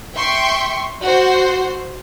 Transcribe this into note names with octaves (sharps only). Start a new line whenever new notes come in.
E5 G5 C6 C#6
F#4 C5